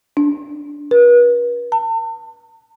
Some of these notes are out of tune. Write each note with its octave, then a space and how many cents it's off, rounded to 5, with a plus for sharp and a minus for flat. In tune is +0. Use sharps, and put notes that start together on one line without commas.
D4 -10
B4 -40
A5 +40